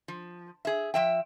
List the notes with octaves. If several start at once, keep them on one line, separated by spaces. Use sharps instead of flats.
F3
G#4 E5
F3 E5 G5